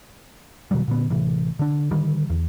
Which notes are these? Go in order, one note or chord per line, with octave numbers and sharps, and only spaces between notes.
B2 D#3 F#3 G3
A#2 D3 B3
A1 C3 E3
D3 D4
D3 D#3 G3
E2